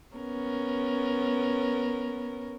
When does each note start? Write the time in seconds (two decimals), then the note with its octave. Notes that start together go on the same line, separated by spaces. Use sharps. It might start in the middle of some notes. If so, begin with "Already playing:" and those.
0.16 B3 C#4 A#4